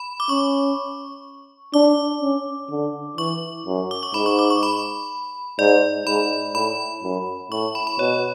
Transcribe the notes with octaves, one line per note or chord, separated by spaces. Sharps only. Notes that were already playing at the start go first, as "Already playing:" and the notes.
Already playing: B5
D6
C#4 C#6
D4 D6
C#4
D3
E3 C#6
F#2
D6
C#6
G#2 B5
C#6
D6
C#6
B5
G#2 D5
G#2 B5
A2 B5
F#2
A2 C#6
B5
B5
B2 C#5